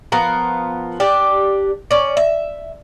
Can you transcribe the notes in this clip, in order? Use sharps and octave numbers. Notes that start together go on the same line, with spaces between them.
F3 B3 F4 A#4
D4 G4 D5
C#4 D5
E5